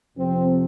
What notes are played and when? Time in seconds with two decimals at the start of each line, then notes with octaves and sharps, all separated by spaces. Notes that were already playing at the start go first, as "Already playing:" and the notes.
0.17 F2 C3 F3 C4